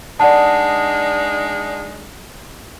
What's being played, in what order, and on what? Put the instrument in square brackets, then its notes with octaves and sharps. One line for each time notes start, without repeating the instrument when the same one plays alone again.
[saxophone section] G#3 D4 D#4 [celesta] D5 F#5 A5